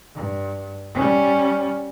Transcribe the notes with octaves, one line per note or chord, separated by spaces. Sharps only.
G2
G3 C#4